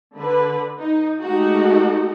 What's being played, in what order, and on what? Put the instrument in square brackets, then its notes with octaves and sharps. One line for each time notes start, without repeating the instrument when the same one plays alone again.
[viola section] D3 B4
D#4
G#3 A3 D#4 F#4 G4 A4